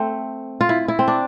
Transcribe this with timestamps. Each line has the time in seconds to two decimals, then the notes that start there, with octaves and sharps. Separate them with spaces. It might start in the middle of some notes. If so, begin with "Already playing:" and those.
Already playing: A3 C4
0.61 F4
0.69 E4
0.88 E4
0.99 C4
1.08 D4